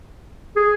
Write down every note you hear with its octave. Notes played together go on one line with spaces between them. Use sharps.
G#4